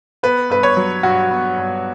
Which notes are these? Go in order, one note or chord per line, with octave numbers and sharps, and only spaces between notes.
B3 B4
G2 B4
C#5
F#3
G2 F#4
B3
G2